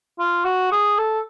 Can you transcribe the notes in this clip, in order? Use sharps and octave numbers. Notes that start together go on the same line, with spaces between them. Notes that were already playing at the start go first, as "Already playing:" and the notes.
F4
F#4
G#4
A4